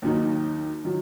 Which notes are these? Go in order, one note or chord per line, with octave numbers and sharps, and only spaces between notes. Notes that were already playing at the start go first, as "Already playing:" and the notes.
D#2 D#3 F#3 D#4
D#3 F#3